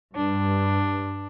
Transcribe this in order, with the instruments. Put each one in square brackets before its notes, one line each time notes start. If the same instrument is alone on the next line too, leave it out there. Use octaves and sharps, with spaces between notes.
[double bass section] G2 [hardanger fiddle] D4